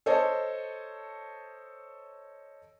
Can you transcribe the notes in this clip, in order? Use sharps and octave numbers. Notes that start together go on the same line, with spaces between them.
A4 C5 C#5 D#5 A5